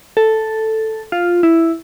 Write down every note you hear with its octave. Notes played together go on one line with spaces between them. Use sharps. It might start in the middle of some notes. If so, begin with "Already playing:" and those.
A4
F4
E4